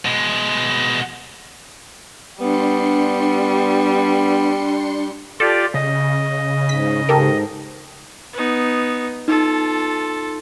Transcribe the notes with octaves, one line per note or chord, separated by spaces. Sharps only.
B2 G#3
G3 B3 D4 C6 C#7
F4 G4 A4 D5
C#3 D#5
G#2 B6
G#2 G4 A4 A#4
B3 D#4
D#4 F4 A4